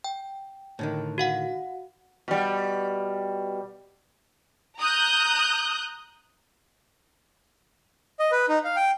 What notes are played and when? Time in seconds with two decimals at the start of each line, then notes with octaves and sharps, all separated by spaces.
0.04 G5
0.79 A2 D3 D#3
1.18 F#4 F5 F#5
2.28 B2 G3
4.78 A#5 D#6 F#6 G6
8.20 D#5
8.32 B4
8.49 D#4
8.64 F5
8.76 G5